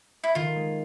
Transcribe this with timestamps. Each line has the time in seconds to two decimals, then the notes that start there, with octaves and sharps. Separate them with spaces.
0.24 E4
0.35 D#3 F4
0.55 G#3